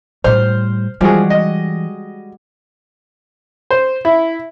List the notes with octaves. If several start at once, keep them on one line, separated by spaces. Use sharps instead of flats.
A2 G3 C5 F6
E3 F3 G3 G#3 F#4 G#4
D#5
C5
E4